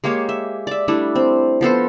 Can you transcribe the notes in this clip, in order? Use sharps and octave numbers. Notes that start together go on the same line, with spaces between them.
G#3 A#3 G4 C#5
E5
D5 E5
G3 A3 D4 E4
C4
F3 B3 A4 C5